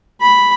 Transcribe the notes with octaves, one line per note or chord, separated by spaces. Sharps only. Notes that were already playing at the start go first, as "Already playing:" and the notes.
B5